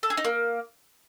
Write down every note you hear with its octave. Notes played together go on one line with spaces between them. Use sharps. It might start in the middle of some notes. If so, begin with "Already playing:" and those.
A4
G#4
D#4
A#3